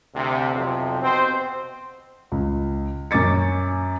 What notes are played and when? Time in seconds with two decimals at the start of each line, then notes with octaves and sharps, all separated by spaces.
0.15 D2 C3
0.54 B1 F2 C3
1.03 B2 C4 C5
2.32 C#2
3.11 F#2 C#4 D6 A6 C#7